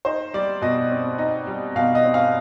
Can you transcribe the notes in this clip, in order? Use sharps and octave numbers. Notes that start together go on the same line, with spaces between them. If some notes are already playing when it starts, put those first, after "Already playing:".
D#4 C5
G3 D5
B2 D#5
C4
D#4
G3
B2 F5
D#5
C4
F5